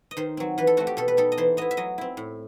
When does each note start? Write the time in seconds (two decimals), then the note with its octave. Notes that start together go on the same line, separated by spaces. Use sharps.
0.11 D#5
0.17 D#3 C5
0.37 F#3 C4
0.58 E3 B4
0.67 A4
0.77 A3 C4 F#4
0.87 G4
0.97 B2 A4
1.08 B4
1.17 G3 D#4 A4
1.32 D#5
1.37 E3 C5
1.57 B3 E4 D#5
1.71 E5
1.77 F#3 D#5
1.98 C4 E4
2.17 A2